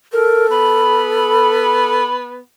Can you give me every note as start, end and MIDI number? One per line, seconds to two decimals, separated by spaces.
0.13 2.01 69
0.13 0.47 70
0.51 2.39 59
0.51 2.16 83